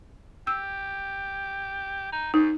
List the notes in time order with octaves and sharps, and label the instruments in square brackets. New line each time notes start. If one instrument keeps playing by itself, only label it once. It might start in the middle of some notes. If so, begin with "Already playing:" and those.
[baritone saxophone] G4 [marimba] E6
[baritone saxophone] D#4
[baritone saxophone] F#2 [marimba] D#4